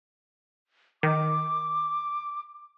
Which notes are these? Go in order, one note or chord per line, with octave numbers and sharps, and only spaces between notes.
D#3 D6